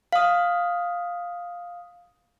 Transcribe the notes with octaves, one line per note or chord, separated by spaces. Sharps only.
F5 D#6